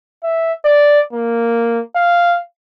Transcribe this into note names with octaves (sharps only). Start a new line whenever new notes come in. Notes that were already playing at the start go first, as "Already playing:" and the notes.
E5
D5
A#3
F5